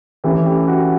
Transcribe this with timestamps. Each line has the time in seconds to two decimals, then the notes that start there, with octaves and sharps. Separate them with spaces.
0.24 E3 A3 C#4 G4
0.46 G4
0.68 F#4